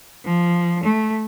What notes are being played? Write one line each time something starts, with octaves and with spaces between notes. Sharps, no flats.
F3
A3